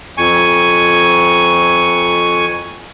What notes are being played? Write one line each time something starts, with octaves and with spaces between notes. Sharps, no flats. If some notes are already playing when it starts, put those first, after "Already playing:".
F2 G#5 C#6